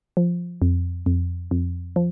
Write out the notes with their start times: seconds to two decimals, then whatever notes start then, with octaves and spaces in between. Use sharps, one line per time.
0.17 F3
0.62 F2
1.06 F2
1.51 F2
1.96 F3